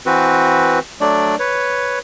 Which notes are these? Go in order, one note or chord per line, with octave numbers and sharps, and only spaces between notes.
E3 C4 F#4 B4
F#3 A3 D4 D5
B4 C#5